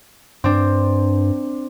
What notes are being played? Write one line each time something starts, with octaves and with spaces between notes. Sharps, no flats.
G2 C4 D4